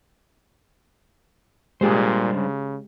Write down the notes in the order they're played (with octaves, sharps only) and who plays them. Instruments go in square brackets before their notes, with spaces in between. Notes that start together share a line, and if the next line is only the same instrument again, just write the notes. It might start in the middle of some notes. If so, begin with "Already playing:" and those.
[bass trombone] A#2 [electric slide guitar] G3 D4 C5 [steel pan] G#3 G4 G#4
[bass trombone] C#3